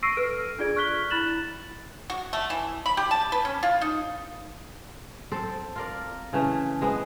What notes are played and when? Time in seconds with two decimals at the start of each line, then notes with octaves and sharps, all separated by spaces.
0.03 C#6 E6 A#6 C7 D7 D#7
0.17 A4 B4 F6 D7
0.59 D4 F4 G#4 D5 G#6 D7
0.76 C#6 F6 F#6 B6 G7
1.10 E4 B5 F#6 A6 E7 F#7
2.10 F#4
2.33 A3
2.50 E3
2.86 B5
2.97 G4
3.11 A5
3.32 B4
3.45 C#4
3.63 F4
3.81 D#4
5.32 C4 A4 C5
5.76 F4 A#4 D5
6.33 C#3 E3 A3
6.81 G#3 B3 C4